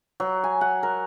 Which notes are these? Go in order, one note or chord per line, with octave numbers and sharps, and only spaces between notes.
F#3
G#5
F#5
A#4